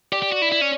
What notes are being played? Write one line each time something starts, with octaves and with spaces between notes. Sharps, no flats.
G4 D5
G4
F#4
E4
E4
C#4